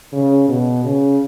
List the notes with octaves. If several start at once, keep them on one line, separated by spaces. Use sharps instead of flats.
C#3
B2
C#3